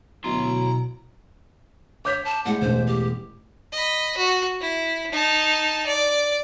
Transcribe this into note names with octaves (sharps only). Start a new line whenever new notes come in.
D2 B2 F#3 E4 A#5 C6
C#5 D6 G6 B6
A5
A2 G#3 F#5
E1 A1 C5
G4
D#5 B5
F#4
E4
D#4 A5
D5